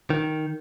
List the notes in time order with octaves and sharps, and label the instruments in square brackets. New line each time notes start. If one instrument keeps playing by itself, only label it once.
[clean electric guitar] D#3